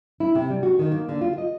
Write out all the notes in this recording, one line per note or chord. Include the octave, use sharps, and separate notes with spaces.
E4
C3
G3
F#4
D#3
A#3
D3
F4
D#5